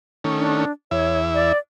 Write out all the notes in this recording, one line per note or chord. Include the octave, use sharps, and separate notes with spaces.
D#3 A3 C#4
D4
E2 E4 C#5 E5
D5